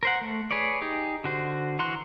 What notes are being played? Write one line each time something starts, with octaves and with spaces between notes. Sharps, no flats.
A#4 C5 F#5
A3
G#4 B4 C#5 D5
D#4 G4 G#4
D3 F#4 C5
E3 F#4 A#5 C6 F#6